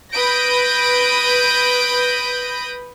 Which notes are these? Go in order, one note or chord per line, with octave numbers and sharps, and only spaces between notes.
B4 B5 D#6 G6 A#6 D7